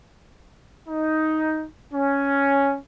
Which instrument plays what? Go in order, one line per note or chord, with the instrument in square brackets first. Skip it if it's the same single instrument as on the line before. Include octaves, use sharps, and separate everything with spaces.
[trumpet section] D#4
C#4